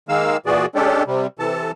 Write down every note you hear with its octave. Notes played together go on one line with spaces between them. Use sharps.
D#3 G#3 A#3 F5 E6
A#2 E3 F#4 G#4 D5
G#3 C#4 D4 G4 A4
C3 G3
C3 E3 A4 A5